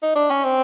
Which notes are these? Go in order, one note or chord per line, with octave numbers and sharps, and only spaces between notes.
D#4
D4
C#4
C4